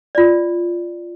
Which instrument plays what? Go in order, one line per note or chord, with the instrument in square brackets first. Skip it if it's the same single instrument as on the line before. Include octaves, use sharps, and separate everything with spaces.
[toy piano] F4 D5